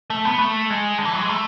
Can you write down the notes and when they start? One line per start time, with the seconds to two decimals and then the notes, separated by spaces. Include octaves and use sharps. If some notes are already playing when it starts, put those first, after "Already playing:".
0.10 A3
0.25 B3
0.38 A3
0.70 G#3
0.98 D3
1.05 E3
1.13 F#3
1.22 G#3
1.29 A3